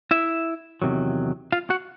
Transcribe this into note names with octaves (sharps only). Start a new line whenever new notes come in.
E4 E5
E2 C3 D#3 F#3
F4 F5
F#4 F#5